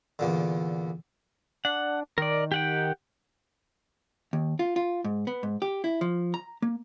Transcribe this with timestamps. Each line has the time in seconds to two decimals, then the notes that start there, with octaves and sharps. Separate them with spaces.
0.19 E2 A#2 D3
1.65 D4 F#5
2.18 D#3 A#4 D5
2.52 G4 F#5 G5
4.33 D#2
4.59 F4
4.76 F4
5.04 G#2
5.27 B3
5.43 G#2
5.62 G4
5.84 E4
6.01 F3
6.34 A#5
6.62 A#3